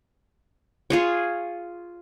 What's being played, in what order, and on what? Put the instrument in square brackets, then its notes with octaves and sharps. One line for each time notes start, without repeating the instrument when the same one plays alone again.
[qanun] F4 G#4 C#5